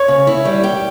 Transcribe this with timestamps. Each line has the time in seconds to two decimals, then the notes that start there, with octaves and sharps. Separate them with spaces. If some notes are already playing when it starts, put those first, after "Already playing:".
Already playing: C#5
0.08 C#3
0.27 E4
0.45 G3
0.63 G4